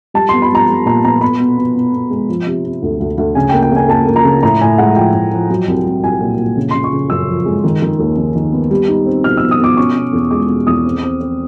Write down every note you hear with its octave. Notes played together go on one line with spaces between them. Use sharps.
G3 A5
B3 C6
B5
G3 A#5
G3
A#2 A#5
B3 A#5
B3 B5
B2
B3
B2
B2
G#3
F3
C3
C3
D2
D2
D2
C#3 G#5
G5
A#3
G5
C#3 G#5
A#3 A5
A#3
A#5
C#3
A2 A#5
A2 G#5
G#3 F#5
F3 G5
A2
F3
F#3
C2
C2
C2 G#5
A#2
A#2
C#3
C#3 C6
C#6
C#3
F#2 E6
F3
G#3
D#3
D#3
D#2
D#3
D#3
B3
G3
D#4
C4
B2 F6
E6
B2
D#6
B2 D6
C#4 C#6
B2
E2
G#3 D6
B2
E2 D#6
C4
C4
C4